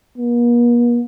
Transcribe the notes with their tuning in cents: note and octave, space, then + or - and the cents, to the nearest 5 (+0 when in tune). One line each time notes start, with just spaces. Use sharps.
A#3 +45